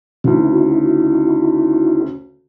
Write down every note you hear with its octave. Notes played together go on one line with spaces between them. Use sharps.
D2 C#3 D#4 E4 F#4